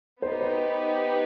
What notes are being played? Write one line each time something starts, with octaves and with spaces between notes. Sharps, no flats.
B3 D#4 G4 C5
B4
C5